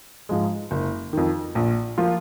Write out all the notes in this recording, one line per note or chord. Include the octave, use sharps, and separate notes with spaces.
G#2 F3 G#3
F#1
F2 D#3
A#1
F3 A#3 F4